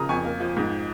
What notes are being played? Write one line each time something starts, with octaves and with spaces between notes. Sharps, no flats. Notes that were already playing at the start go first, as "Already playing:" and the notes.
Already playing: C#3 F3 C#4 A#5 D#6
F2 G#5 C#6
A#3
F3
G#2